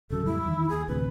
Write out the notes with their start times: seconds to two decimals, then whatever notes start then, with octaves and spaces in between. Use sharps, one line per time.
0.10 D1 C#3 F#3 A4
0.26 F2 A2 G3 E4
0.45 E2 D#3
0.70 D#2 G#4
0.88 A1 D2 C3 B4